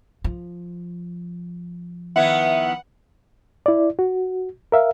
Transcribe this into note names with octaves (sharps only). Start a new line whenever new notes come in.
F3
D#3 B3 E4 E5 F#5
E4 D5
F#4
A#4 E5 F5